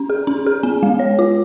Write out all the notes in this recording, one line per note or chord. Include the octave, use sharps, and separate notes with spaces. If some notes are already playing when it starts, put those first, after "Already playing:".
Already playing: C#4
G#4
C#4
G#4
B3
G#3
C#5
F4